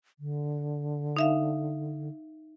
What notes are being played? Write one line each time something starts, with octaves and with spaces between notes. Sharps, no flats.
D3
D#4 E5 F5